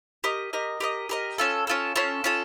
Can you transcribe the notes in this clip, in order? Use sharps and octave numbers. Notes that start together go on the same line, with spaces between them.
G4 A#4 D#5
G4 A#4 D#5
G4 A#4 D#5
G4 A#4 D#5
C#4 F4 A4
C#4 F4 A4
C#4 F4 A4
C#4 F4 A4